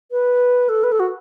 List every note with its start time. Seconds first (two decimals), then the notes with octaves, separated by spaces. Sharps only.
0.11 B4
0.69 A4
0.83 B4
0.92 A4
1.00 F#4